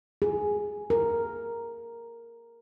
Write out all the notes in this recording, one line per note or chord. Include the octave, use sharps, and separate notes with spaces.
G#4
A#4